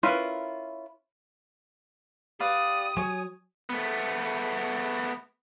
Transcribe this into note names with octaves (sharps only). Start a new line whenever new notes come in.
C#4 E4 F4 A#4 B4
G4 B4 D5 F5 D#6
F#3 C#5 G#5
A3 B3